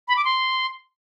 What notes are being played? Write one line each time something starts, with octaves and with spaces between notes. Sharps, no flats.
B5
D6
C6